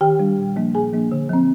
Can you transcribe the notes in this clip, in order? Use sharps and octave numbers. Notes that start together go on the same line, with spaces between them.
D#3 G4 G5
G3 D4
A#2
F3 A#3 D4
A#2 G#4 G#5
F3 A#3 D4
D3
F3 C4